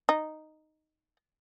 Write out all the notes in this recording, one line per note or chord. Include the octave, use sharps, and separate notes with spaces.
D#4